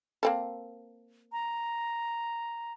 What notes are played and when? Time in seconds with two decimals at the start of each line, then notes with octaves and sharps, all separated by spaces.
0.23 A#3 C4 A4
1.32 A#5